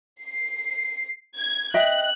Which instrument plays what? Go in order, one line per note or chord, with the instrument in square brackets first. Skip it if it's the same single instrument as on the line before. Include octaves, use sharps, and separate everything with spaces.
[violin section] C7
G#6
[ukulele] D#5 E5 G5 [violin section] F#6